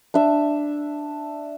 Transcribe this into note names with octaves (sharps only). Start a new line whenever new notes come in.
D4 E5